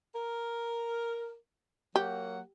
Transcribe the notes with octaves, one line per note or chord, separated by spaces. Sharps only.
A#4
F#3 A#3 G4 F#5